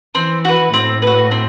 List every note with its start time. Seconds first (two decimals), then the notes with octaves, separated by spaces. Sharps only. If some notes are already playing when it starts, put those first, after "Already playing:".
0.15 E3 C4
0.45 F#4 B4
0.73 A2 C4
1.02 F#4 B4
1.31 C4